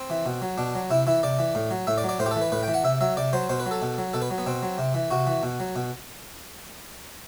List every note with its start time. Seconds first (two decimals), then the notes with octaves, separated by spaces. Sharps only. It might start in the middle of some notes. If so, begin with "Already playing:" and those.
Already playing: C4
0.10 E3
0.26 B2
0.42 F#3
0.58 B2 D4
0.75 F#3
0.90 C3 E4
1.07 E3 E4
1.23 C3 D5
1.39 E3
1.55 A2
1.71 F#3
1.87 A2 E5
1.98 D5
2.03 F#3
2.09 D5
2.19 A2 C5
2.26 G4
2.31 A4
2.36 E3
2.42 B4
2.52 A2 B4
2.63 G5
2.68 E3
2.74 F#5
2.84 C3 E5
3.01 F#3 E5
3.17 C3 D5
3.33 F#3 C5
3.49 B2 C5
3.60 B4
3.66 F#3
3.71 A4
3.82 B2
3.98 F#3
4.13 B2 A4
4.22 B4
4.31 F#3
4.38 B3
4.46 B2 C4
4.63 F#3
4.78 C3
4.94 E3
5.10 C3 F#4
5.27 E3
5.43 B2
5.60 F#3
5.76 B2